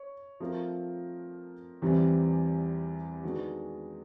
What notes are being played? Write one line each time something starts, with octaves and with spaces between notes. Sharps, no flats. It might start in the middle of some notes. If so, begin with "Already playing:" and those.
Already playing: C#5
F3 A3 C4 F4 A#4
E2 C3 E3 G3 C4
D#3 G#3 B3 D4 F#4